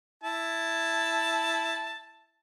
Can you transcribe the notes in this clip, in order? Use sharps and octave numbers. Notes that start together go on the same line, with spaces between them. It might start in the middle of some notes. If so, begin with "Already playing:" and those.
E4 A5